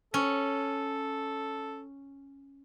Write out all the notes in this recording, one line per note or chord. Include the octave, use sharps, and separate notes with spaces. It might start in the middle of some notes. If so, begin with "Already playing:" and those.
C#4 A4